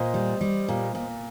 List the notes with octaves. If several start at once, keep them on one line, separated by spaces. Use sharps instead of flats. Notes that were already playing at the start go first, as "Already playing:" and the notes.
Already playing: A#2 C5 D#5
G3
G3
A#2
A#2